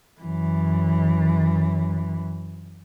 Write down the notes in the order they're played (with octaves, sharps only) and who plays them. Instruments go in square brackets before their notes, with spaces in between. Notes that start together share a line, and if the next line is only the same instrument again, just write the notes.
[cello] F#2 E3